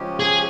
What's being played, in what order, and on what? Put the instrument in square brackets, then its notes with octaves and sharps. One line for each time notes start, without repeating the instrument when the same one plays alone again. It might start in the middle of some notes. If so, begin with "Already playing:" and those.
Already playing: [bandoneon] C#3 F3 G#3 C#4 G4
[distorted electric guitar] G#4